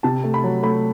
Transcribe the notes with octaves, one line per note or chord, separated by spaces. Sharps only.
C3 A5
A3
B5
F#3
A3 B5